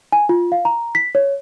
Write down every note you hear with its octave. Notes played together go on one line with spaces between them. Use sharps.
G#5
F4
F5
A#5
B6
C#5